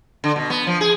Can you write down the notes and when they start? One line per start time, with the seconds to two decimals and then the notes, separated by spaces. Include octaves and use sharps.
0.24 D3
0.36 B2
0.50 B3
0.67 F3
0.81 G#4